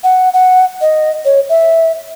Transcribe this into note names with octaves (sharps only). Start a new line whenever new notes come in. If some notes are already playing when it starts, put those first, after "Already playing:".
F#5
F#5
D#5
C#5
E5